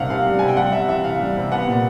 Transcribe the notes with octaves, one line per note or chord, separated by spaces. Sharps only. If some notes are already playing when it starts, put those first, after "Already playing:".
Already playing: C3 D#3 G3 F5 F#5
C3 F5
G3
C3 G#5
G5
G3 F#5
C3 E5
E3 E5
C3 F5
G3
C3
B3 F#5
A#2